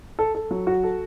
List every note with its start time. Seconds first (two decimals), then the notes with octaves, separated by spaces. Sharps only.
0.19 A4
0.35 A4
0.51 F#3
0.67 F#4
0.84 A4